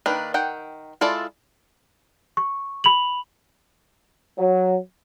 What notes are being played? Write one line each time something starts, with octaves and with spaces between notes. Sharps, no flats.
D#3 A#3 D4 B4
D#3 F#5 G5
G#3 E4 F4 A4 D5
C#6
B5 F7 F#7
F#3